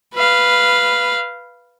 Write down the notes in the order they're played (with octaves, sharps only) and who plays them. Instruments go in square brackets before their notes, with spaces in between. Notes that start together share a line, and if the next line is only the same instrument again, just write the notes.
[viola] B4 F5